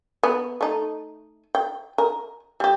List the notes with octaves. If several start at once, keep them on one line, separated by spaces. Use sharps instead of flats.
B3
A3 D#4
G5
A#4
G3 G4